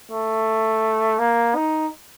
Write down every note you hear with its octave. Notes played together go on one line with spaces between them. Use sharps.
A3
A#3
D#4